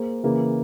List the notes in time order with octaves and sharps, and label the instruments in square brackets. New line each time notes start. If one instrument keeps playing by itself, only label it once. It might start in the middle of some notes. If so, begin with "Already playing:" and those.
Already playing: [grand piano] A#3 G#4 C5
C#3 E3 A#3